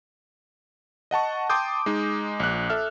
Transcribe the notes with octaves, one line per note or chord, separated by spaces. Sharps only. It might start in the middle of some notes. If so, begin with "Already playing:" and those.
D#5 F#5 A5 C#6
G5 A5 C6 D6 D#6 G6
G#3 D#4
A#1 F#6
A4 E5 F6